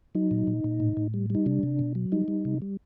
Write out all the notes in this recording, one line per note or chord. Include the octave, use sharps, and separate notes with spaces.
F#3 D#4
A#2
A#2
A#2
A2
A2
G3
G3 D#4
C3 D4
C3
B2
F#3
G3 D#4
G3
C3
G3